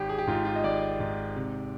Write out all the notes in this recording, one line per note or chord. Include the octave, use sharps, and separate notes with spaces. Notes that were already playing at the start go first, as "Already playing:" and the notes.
Already playing: G#1 G4
G#4
G4
G#2 F4
F4
D#5
G#1 D5
G#2
C3